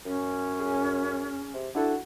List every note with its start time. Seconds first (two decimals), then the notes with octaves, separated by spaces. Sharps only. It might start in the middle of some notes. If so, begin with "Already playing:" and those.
0.06 F#2 C#4
0.60 G#4
1.54 C3
1.75 D4 E4 F#4 A4